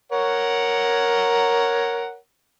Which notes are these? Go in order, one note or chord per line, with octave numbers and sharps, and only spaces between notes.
A#4 C#5 F#5